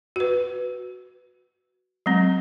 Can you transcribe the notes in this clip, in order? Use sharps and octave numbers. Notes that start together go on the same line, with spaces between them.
F#4 B4
F#3 G#3 C4